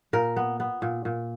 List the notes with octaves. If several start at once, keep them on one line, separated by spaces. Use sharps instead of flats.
A#2 A#4
B3
B3
A#2
A#2